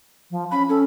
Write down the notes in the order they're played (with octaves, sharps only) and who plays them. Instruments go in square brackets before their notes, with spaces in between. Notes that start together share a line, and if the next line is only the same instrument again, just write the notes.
[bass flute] F3
[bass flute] C#4 [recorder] B5
[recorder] C#4 [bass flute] A4